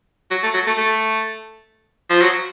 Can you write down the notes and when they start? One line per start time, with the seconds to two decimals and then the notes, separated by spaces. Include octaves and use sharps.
0.31 F#3
0.43 A3
0.54 F#3
0.67 A3
0.78 A3
2.10 F3
2.22 F#3